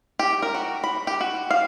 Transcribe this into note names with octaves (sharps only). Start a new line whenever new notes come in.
G4
A#4
F#4
B5
G4
F#4
F5